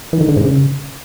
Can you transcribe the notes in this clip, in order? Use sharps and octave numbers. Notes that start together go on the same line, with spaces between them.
E3
D#3
D3
G#2
C#3